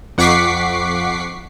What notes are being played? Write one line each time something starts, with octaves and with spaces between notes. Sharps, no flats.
F2 F#5 C#6 D6 B6 C7